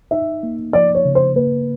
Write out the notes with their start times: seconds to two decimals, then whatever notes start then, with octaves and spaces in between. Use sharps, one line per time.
0.11 D#4 E5
0.43 A#3
0.73 F3 D5
0.95 C#5
1.05 C#3
1.15 C5
1.36 A#3 B4